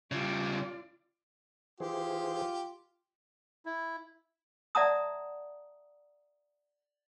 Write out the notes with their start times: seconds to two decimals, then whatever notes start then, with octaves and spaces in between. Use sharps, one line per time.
0.12 C#3 G3 F4 D5
1.80 E3 F4 G4 G#4 C5
3.66 E4
4.75 D5 E5 F#5 A5 A#5 D#6